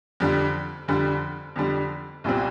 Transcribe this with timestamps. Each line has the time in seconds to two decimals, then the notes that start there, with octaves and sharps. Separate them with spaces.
0.20 F2 D3 G3
0.88 F2 D3 G3
1.56 F2 D3 G3
2.24 C2 A#2 G3 C4